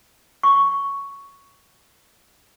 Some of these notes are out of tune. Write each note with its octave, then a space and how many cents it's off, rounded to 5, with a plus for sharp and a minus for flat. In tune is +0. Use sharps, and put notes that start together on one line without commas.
C#6 +5